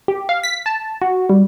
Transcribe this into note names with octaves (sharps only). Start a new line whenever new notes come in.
G4
F5
B6
A5
F#4
G3